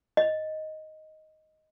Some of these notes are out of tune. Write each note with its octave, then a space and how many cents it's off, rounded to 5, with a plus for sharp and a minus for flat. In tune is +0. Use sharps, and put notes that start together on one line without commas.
D#5 +5